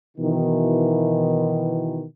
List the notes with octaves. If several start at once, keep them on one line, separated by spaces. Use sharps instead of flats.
B2 D#3 E3